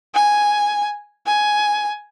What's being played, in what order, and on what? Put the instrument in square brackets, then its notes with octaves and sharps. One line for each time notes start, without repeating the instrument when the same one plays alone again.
[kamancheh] G#5
G#5